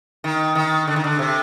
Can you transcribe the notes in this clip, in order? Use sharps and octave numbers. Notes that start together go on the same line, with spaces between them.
D#3
D#3
D3
D#3
D3
C3